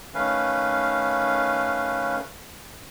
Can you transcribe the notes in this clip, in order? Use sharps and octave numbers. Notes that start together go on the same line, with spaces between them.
D#3 A3 C#4 B4 F5